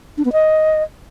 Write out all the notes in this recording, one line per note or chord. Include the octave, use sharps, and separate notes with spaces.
D4
B3
D#5